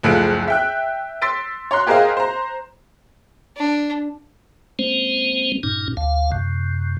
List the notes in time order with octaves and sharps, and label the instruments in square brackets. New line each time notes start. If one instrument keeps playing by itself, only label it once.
[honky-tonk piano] F#1 C#2 F3 A3 F#6 D7
E5 G5 F#6
C6 E6 A6 B6 D7
C#5 A#5 C6 F#6
G4 G#4 A#4 C5 D#5 F5
C5 A#5
[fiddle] D4
[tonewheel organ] G#3 A#3 C4 C#4 C5
G2 A#2 C#4 D#4
D2 F5
F#2 C3